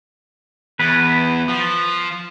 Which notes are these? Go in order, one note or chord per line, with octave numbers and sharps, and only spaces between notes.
E2 B4
F3